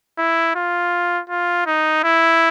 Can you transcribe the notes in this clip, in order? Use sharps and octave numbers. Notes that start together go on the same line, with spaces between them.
E4
F4
F4
D#4
E4